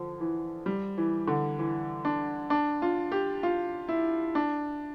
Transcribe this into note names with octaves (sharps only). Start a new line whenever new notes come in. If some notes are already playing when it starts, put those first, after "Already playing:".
Already playing: D3 F3
E3
G3
E3
D3
E3
D4
D4
F4
G4
F4
E4
D4